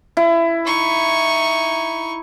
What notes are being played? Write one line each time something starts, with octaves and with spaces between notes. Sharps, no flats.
E4
D#4 C#6